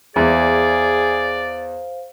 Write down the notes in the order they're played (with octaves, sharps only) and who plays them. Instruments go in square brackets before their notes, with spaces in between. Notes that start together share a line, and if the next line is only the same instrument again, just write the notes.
[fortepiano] E2 [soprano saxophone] G#4 [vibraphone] C5 F5 [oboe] D5